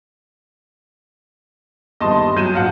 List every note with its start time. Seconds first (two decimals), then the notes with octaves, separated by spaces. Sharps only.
2.00 G1 D#2 D#5 A5 C6
2.37 F#3 G6 D#7 E7
2.55 A#1 F5 F#5 A5